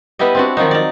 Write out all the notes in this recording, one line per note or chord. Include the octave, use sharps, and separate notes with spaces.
G3 B3 E4 G4 D#5
C4 D4 F#4
D#3 F3 F#3 D#4
D#4 D5